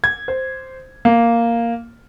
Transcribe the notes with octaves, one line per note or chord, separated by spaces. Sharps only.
G#6
C5
A#3